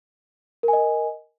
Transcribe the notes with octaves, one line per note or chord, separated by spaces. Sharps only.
A#4 D#5 G#5